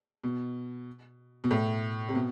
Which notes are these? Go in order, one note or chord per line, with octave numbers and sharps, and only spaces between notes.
B2
B2
A2
C3
B2